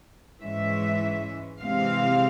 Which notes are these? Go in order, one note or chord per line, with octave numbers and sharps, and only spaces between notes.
G#2 E3 G#3 C#4 E5
C3 E3 G#3 C4 F5